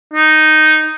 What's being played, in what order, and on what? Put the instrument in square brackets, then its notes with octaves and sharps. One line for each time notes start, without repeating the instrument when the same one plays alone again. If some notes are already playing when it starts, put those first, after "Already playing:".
[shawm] D#4